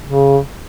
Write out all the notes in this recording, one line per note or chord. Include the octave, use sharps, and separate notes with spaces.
C#3